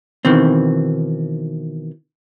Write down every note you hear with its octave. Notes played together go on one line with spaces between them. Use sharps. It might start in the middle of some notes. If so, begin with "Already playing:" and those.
B2 D#3 E3 C4